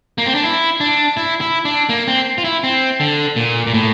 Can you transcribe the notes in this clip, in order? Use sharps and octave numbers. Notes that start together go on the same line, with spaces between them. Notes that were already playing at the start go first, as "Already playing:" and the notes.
A#3
C4
D4
E4
D4
E4
E4
D4
A#3
C4
F4
E4
C4
D3
A#2
A#2
A2